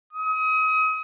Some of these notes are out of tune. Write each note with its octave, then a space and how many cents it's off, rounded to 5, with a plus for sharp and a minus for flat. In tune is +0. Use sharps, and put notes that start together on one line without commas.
D#6 +35